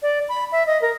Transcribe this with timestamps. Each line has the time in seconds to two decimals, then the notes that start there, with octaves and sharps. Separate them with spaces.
0.02 D5
0.29 B5
0.52 E5
0.67 D#5
0.82 A#4